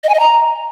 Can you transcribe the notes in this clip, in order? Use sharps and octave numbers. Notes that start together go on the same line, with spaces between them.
D#5
G#5
D#5
A#5